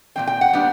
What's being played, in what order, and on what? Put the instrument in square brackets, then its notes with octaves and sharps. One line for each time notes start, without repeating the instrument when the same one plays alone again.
[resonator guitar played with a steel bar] A#2 G3 C4 G5
G5
F#5
A#2 G3 B3 D4